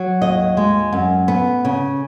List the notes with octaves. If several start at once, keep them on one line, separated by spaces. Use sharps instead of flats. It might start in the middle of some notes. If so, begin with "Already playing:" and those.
Already playing: F#3
D#2 D#5
G#3
F#2
B3
C#3